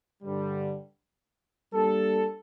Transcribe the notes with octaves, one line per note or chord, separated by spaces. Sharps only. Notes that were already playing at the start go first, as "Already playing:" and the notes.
G2 D3 G3
G3 A#3 D4 A4